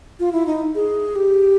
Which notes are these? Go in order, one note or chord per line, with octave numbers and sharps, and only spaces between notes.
F4
E4
D#4
G#4
G4